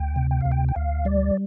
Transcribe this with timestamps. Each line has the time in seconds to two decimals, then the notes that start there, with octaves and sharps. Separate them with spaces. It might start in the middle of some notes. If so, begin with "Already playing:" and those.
Already playing: D2 G5
0.16 C3
0.31 G5
0.41 D2 F5
0.52 G5
0.69 G5
0.76 D2 F5
1.05 G3 D5